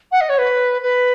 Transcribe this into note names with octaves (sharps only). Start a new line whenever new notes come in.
F#5
D#5
C#5
B4
B4